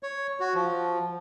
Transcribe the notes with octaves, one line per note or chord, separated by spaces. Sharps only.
C#5
F#4
F3